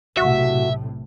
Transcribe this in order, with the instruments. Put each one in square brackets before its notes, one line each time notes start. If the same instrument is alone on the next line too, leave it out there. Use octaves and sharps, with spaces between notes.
[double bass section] B1 A2 C3 [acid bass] F#4 [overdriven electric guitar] E5